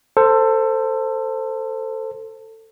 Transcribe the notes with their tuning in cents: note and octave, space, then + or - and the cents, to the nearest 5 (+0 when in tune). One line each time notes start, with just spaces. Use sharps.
A4 +20 C5 +0